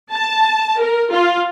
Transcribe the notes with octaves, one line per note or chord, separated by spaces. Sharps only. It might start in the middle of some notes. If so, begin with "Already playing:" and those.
A5
A#4
F4